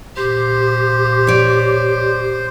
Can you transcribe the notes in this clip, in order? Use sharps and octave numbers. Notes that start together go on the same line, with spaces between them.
A#2 G4 C5
C#5 D5